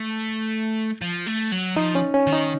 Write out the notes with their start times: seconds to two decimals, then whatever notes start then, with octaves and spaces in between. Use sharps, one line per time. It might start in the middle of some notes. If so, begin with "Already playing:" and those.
Already playing: A3
1.02 F3
1.27 A3
1.52 F#3
1.77 F3 D#4
1.95 C#4
2.14 C#4
2.27 D#3
2.32 D#4